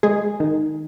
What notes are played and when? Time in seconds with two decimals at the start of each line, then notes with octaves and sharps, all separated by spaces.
0.03 G#3 G#4
0.40 D#3